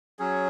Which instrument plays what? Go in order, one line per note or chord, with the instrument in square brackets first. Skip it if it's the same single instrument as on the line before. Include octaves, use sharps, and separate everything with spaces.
[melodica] F#3 C#4 G#4